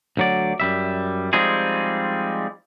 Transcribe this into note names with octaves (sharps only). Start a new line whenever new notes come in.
D2 F#3 D5
F#2 G3 E5
F3 G3 G#3 C4 D#4 G#4